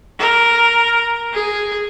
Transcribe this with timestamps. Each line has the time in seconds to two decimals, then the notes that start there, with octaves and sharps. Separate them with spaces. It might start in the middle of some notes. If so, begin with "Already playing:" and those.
0.19 A#4
1.33 G#4